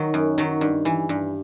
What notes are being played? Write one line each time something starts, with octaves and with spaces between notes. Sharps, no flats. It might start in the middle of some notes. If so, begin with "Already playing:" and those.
Already playing: D#3 F#3
F#2
D#3 F#3
G2
E3
G2